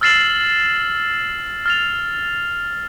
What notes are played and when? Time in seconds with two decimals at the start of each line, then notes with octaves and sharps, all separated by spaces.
0.01 E6 F6 A6 C7 E7 F#7
1.66 F6 A6 F7